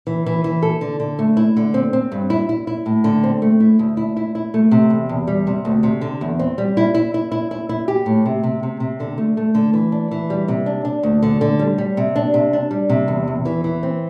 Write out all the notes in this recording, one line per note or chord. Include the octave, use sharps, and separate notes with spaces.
E3
E3
E3
A4
D3
D3
A3
E4
D3
C4
C4
G2
E4
E4
E4
A2
D3
C4
A3
E4
D2
E4
E4
E4
A3
C3
E2
E2
G3
C3
D2
C3
D3
E2
C4
G3
E4
E4
E4
E4
E4
E4
G4
A2
C3
C3
C3
C3
D3
A3
A3
D3
E3
D4
E3
G3
C3
D4
D4
D2
D3
D3
G3
G3
C3
D4
C3
D4
G3
C3
E2
E2
E3
E3
C4